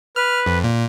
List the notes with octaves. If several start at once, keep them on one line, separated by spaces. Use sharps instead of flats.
B4 F6
F2
A#2